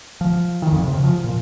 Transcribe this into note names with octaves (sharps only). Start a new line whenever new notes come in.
F3
D#3
F2
C3
C#3
F3
A#2